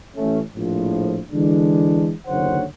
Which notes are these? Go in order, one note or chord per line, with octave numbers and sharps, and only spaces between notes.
A1 A3 C#4
A#1 A2 F3
D3 E3 G#3 D4
F#1 D#2 D3 C5 C#5 F#5